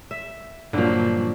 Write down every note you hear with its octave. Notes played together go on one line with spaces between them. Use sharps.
E5
G2 A#2 D3 F3 F#3